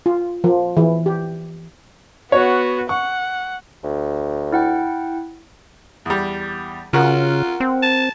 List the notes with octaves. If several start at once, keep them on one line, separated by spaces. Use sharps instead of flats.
F4
F3
E3
G4
B3 F#4 C#5
F#5 C#6
D2
E4 F#5 G5
E2 G3
C#3 F4 F#4 A#4
C4
A5